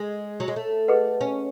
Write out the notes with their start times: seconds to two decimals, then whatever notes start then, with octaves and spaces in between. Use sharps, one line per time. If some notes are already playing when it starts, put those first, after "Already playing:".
Already playing: G#3 G#4
0.40 F#3
0.48 G#3
0.56 A3
0.88 G#4 B4 D#5 F#5
1.21 C#4